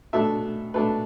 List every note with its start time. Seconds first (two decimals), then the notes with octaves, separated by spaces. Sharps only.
0.13 B2 A3 D4 E5
0.74 B2 A3 D4 B4